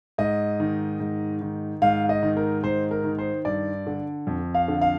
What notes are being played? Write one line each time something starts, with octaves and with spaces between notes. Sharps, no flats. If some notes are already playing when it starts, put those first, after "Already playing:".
G#2 D#5
D#3
G#2
D#3
G#2 F5
D#5
D#3
A#4
G#2 C5
A#4
D#3
C5
G2 D5
D3
F2
F5
D3
F5